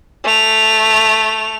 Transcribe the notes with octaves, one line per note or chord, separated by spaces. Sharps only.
A3 F7